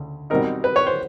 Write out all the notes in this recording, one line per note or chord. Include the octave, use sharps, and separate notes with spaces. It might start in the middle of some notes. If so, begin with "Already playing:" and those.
Already playing: D2 C#3
B2 G3 C4 D#4 A#4
B4
C#5
C5